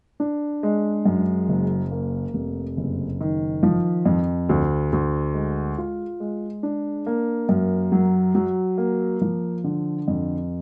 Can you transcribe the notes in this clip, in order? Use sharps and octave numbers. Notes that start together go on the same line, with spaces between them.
D4
G#3
F#2
F#1
A#3
F1
F#1
D#3
F3
F2
D2
D2
G#3
F4
G#3
D4
A#3
F#2
F#3
F#3
A#3
F3
D3
F2